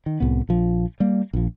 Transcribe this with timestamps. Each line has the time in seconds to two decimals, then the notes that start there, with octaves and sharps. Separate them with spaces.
0.06 D#3
0.20 C2 A2 B3
0.49 A#1 F3
1.00 G3 A#3
1.33 A#1 F3